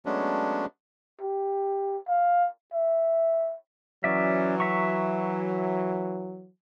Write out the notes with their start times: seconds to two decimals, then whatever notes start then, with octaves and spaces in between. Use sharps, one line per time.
0.06 F#3 G#3 A3 B3 C#4 D4
1.21 G4
2.08 F5
2.73 E5
4.04 E3 F#3 C#4 D5 E5
4.60 E5 A#5 C#6